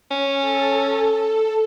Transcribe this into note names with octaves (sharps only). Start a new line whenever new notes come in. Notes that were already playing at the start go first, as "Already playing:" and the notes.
C#4
A4